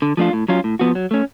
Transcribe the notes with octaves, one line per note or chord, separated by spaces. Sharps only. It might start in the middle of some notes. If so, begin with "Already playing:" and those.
D3
F3 A3 D4 F4
A2
F#3 C#4 F4
A2
F3 B3 F#4
F#3
A3 C#4